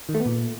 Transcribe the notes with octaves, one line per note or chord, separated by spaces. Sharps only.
D#3
A3
B3
A#2